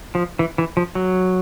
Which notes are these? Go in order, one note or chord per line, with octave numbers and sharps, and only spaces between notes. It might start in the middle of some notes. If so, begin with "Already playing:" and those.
F3
E3
E3
F3
F#3